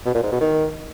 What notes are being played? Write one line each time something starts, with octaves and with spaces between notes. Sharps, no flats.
B2
A#2
G#2
B2
D#3